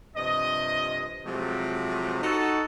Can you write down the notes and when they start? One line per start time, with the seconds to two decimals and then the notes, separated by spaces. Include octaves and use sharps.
0.16 G2 C3 F3 D#5
1.24 C3 F3 F#3 G#3 A3
2.21 D#4 F#4 A4